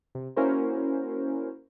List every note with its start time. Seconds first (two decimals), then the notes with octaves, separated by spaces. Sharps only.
0.15 C3
0.36 A#3 C#4 E4 F#4 A#4 C5